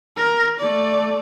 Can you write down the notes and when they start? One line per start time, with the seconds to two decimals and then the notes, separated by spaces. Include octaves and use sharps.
0.17 A#4
0.59 A3 D5